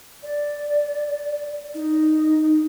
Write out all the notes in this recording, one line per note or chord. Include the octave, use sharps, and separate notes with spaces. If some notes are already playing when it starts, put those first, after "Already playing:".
D5
D#4